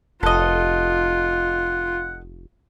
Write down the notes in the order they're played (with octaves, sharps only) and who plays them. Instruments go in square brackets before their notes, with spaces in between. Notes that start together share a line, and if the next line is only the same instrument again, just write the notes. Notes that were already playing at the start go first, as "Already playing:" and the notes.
[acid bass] F1 [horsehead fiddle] F4 [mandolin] A4 D#5 [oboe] F#5